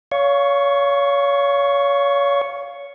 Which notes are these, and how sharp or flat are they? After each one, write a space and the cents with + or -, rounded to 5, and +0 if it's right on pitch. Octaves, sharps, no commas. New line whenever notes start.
C#5 +30 F5 +0 C#6 +0